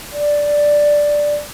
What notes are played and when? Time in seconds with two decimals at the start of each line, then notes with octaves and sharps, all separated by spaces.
0.12 D5